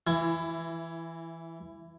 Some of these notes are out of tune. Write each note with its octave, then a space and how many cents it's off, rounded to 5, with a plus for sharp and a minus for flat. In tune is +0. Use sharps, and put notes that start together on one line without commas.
E3 +0 E4 +20